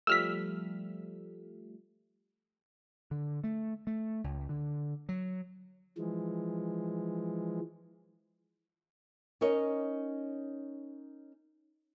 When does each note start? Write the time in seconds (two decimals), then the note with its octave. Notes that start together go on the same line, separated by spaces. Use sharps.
0.07 F3 G3 A3 E6 F6 B6
3.11 D3
3.44 A3
3.87 A3
4.24 C#2
4.49 D3
5.09 F#3
5.98 E3 F3 G#3
9.41 C#4 D#4 A#4 C#5 D#5